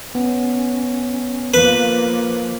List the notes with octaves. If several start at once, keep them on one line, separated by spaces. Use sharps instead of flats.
B3 C#4
F3 A#3 B4